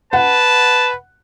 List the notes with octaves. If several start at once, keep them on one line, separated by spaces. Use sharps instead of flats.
B4 F#5 A5